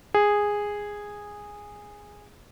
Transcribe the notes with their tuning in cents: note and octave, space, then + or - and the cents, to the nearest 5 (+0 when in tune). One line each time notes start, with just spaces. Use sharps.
G#4 -10